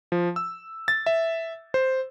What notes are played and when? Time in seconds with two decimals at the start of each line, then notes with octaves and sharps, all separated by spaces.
0.12 F3
0.36 E6
0.88 A6
1.06 E5
1.74 C5